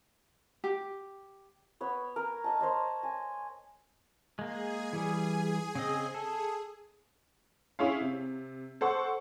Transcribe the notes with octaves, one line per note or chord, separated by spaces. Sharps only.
G4
B3 C#5
A#4
A#4 D#5 A5
C5 C#5 D#5 A5
G#5
G#3 A#3 G#4 G#5
E3 G3
C#3 C4 D#5
G#4 A4
C#4 E4 G#4 C#5 F5
C3
A4 C5 F#5 C#6